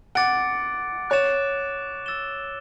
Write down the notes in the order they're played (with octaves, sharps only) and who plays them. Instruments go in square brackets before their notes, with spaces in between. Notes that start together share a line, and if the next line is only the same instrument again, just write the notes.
[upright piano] F#5 [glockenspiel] D6 A6 D7
[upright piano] C#5 [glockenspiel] F#6 A6 E7
[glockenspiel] E6 A6 E7 G7